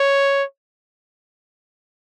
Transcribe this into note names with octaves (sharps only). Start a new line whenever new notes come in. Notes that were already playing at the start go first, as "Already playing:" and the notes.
Already playing: C#5